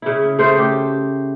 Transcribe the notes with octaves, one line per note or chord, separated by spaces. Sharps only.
C#3 E4
C#3 A3 C5
G4